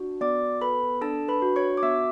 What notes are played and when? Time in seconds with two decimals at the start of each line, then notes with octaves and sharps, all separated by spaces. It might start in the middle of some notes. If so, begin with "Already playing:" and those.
Already playing: D4 F#4
0.21 B3 D5 D6
0.61 A4 B4 B5
1.01 D4 A4 A5
1.28 B4 B5
1.42 F#4
1.56 C#5 C#6
1.77 D6
1.82 B3 E5 E6